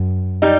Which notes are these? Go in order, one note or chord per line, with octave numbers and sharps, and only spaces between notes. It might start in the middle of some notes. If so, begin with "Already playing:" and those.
Already playing: F#2
G3 D#4